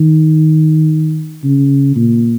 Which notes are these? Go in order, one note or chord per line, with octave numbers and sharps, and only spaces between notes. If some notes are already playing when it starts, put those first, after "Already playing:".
Already playing: D#3
C#3
A#2